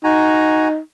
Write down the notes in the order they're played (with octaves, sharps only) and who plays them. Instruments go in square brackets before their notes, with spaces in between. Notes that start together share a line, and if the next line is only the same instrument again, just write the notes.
[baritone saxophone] D#4 [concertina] F#4 G#5 A#5